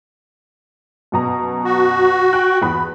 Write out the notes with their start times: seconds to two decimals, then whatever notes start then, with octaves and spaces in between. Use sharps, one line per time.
1.12 F#2 B2 A#5
1.64 F#4
2.33 G5 F#6
2.62 E2 B5 D#6